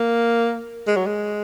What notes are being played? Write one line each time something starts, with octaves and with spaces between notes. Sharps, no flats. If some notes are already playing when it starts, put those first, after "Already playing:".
Already playing: A#3
G#3
F#3
G#3